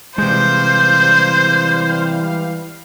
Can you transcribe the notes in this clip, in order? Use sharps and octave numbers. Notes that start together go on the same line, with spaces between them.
C3 E3 G3 G#3 C5 F5 G6